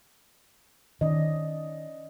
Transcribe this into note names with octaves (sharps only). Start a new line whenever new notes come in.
D#3 C#4 D5 D#5